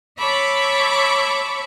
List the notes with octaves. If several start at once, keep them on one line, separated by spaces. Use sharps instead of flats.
C#5 E5 A5 B5 C#6 D6